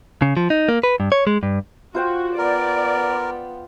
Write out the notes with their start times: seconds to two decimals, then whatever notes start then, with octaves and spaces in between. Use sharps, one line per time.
0.22 C#3
0.37 F3
0.50 D#4
0.69 A#3
0.83 B4
1.00 G2
1.12 C#5
1.27 G#3
1.43 G2
1.94 F4 F#4 C5 G5
2.38 B3 A#4 D5